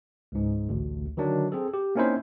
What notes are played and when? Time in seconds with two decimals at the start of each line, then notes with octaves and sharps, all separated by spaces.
0.32 C#2 G#2
0.69 A1 D2
1.17 D3 D#3 F#3 D4
1.52 C4 G#4 A4
1.74 G4
1.95 A#3 C4 C#4 D#4 E4 C5